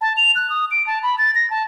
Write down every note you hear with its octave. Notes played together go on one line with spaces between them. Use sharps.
A5
F7
F#6
D#6
D7
A5
B5
A6
A#6
A5